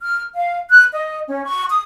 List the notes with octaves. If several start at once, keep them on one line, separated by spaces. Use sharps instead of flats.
F6
F5
F#6
D#5
C#4
C#6
D#6